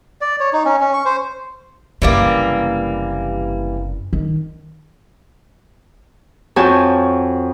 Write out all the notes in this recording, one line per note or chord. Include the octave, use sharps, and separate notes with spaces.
D5
C#5
D#4
C#4
C#4
C#6
C5
F#1 C3 E3 G3 A#3
D#3
F2 F#4 C#5 G#5 A5 G6